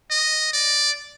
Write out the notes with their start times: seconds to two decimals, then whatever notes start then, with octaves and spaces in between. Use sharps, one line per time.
0.11 D#5
0.53 D5